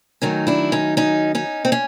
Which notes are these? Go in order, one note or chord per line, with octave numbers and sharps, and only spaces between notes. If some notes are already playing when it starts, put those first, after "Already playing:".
D#3 F#3 A3 C#4 D#4
D4 E4
C#4 D#4
C#4 D#4
C#4 D#4
C4
C#4